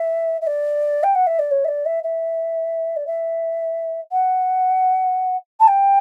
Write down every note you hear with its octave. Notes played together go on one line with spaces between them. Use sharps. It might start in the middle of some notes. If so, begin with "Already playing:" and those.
Already playing: E5
E5
D5
G5
F#5
E5
D5
C#5
E5
D5
E5
E5
D5
E5
F#5
A5
G5